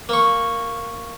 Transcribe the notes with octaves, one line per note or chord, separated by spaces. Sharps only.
A#3 C#6